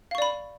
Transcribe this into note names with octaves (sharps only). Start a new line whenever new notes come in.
D5 F5 B5 C#6